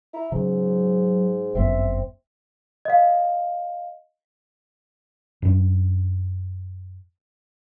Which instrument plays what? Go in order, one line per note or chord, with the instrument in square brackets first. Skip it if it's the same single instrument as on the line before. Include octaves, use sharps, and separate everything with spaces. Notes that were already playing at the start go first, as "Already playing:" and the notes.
[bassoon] E4 [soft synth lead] A#5
[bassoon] G#2 [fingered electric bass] C#3 [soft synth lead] F#3
[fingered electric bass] G1 F#2 B3 [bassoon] C4 [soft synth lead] E5
[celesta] D#5 F5
[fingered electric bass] F#2 D4